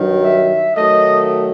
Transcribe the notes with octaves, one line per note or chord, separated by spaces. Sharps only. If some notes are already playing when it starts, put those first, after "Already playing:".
Already playing: G2 D#3 F#3
E5
D#3 F#3 A3 D#5